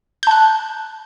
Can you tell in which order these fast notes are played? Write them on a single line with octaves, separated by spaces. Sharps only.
G6 A5 F#6